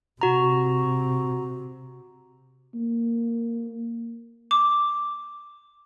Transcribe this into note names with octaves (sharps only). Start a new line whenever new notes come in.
C3 F#4 A#5
A#3
D6